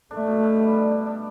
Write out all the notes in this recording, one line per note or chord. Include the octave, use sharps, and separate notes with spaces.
A3 D4
B2
B2
G3
D4
D4
D4